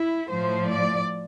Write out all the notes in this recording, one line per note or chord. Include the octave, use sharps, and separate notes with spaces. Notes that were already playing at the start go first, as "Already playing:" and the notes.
Already playing: E4
A2 F3 C5
D5